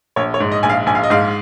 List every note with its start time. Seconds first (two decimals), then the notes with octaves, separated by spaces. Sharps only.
0.16 A#1 C#5
0.34 C#5
0.40 G#2
0.52 D#5
0.63 A#1 G#5
0.69 F5
0.86 A#1 G#5
0.95 F5
1.03 D#5
1.10 G#2 F5